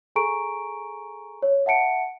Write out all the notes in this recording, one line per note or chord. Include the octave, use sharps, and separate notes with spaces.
G#4 A4 G#5 A#5 C#6 D7
C#5
E5 F#5 A5 C#7 D7